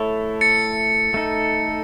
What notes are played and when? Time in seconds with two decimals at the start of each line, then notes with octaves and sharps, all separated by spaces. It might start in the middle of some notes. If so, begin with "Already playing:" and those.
Already playing: A3 E4 A4 C#5
0.41 A6 C#7
1.14 A3 D#4 A4